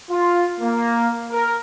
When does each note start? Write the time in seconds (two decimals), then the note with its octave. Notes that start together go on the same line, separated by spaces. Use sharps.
0.10 F4
0.60 A#3
1.31 A#4